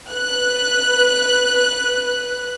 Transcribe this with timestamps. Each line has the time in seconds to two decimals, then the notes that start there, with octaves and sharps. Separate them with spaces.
0.11 B4 F#6